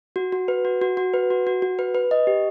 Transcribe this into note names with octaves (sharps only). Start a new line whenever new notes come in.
F#4
F#4
B4
F#4
F#4
F#4
B4
F#4
F#4
F#4
B4
B4
D#5
G4